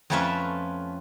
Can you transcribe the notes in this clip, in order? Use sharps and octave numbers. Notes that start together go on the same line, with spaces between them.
F2 A3 C#4 F4 B4 E5